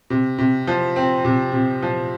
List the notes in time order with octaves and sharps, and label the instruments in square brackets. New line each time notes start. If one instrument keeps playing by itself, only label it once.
[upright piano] C3
C3
F3
C4
C3
C3
F3